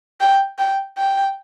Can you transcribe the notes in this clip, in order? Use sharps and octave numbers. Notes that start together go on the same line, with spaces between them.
G5
G5
G5